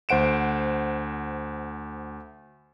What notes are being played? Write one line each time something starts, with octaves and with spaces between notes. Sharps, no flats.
D2 C5 F#5 D7 E7